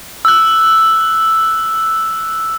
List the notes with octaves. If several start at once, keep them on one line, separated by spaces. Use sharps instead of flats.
E6 F#6